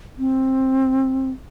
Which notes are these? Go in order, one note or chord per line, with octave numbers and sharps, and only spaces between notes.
C4